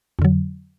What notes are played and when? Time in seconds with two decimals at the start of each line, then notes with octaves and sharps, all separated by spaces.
0.19 F2
0.22 D3
0.25 F#3